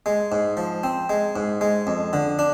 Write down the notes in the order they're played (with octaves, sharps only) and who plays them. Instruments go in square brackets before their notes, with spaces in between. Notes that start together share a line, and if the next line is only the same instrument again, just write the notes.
[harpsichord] G#3
G#2
F3
C4
G#3
G#2
G#3
F2
D3
D4